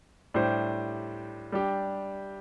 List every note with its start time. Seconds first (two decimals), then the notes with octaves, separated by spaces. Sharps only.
0.34 A2 G3 D4 G4 C5
1.52 G3 D4 G4